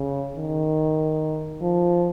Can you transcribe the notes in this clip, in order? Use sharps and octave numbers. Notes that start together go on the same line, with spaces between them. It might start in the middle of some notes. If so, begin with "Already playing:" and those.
Already playing: C#3
D#3
F3